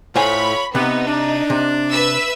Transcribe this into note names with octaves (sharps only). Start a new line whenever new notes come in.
A2 F4 A4 C5 C#5 G#5 B5
C3 B3 D#4
D4
C3
B4 E5 E6